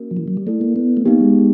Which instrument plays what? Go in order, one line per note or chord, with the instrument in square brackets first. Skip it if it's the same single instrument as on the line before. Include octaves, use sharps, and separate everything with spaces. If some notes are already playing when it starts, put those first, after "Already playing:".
Already playing: [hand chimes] A#3 C#4 F#4 A#4
[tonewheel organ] F3
E3
F#3
G3
[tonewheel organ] A3 [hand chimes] E4 A4 D5
[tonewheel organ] A#3
B3
A3
[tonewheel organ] A#3 [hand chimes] B3 D#4 G4
[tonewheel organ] G#3